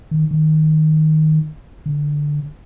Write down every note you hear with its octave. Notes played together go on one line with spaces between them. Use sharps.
D#3
D#3
D3